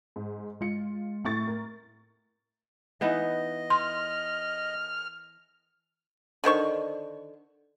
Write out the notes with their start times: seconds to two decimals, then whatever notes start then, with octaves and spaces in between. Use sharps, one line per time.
0.16 G#2
0.61 G#3 F4 C#7
1.25 A2 A3 C#6 A6
1.47 A#4
3.01 E3 B3 D#4 D#5
3.70 C6 F6
6.44 D3 D#3 C5 C#6